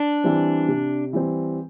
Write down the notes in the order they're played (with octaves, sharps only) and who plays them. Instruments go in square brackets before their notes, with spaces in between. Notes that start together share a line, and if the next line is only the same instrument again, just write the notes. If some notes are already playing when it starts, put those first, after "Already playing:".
Already playing: [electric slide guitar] D4
[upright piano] E3 G3 C4
C3
E3 G3 C4